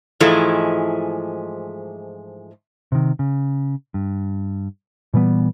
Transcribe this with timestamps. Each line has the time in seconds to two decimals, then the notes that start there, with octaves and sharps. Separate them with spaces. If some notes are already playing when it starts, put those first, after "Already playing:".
0.20 G#2 E3 F3 G#3 A3 E4
2.92 C3 D#3
3.19 C#3
3.94 G2
5.14 A#2 E3 G3 B3